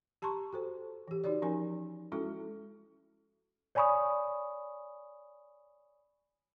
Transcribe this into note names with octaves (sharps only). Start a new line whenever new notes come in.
G4 A5 A#5 C6 C#6
F#4 A4 C5
E3 G4
D#4 F#4 G4 C#5 D5
F3 C#4 D#4 A#4 G#5
G#3 C#4 E4 F#4 A4
C#5 D5 G#5 B5 C#6 D#6